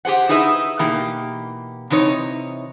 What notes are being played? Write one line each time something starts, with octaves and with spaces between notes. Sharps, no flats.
G4 G#4 C5 F#5
D#4 E4 G#4 B4 E5
B2 E3 A#3 D#4 G4
C3 E3 D#4 C#5